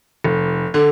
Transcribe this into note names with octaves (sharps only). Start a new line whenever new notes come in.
F1
D3